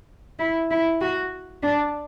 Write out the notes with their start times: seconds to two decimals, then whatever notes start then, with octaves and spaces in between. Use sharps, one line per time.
0.39 E4
0.71 E4
1.01 F#4
1.63 D4